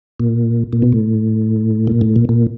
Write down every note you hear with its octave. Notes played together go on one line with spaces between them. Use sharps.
A#2
A#2
B2
A2
A#2
A2
A#2
A#2